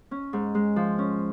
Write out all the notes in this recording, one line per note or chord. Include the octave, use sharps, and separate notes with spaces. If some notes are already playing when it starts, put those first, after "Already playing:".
C#4
G#2
G#3
F3
C#4